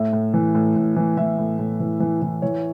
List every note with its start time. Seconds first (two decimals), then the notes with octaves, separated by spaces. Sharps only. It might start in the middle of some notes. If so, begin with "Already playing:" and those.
Already playing: A2 E5
0.13 A2
0.34 E3
0.55 A2
0.76 A2
0.96 E3
1.17 E3 E5
1.38 A2
1.59 A2
1.80 E3
2.00 E3
2.22 E3
2.42 E3 C#5